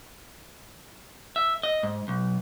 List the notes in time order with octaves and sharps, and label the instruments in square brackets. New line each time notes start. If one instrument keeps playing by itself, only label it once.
[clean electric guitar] E5
D#5
G#2
B1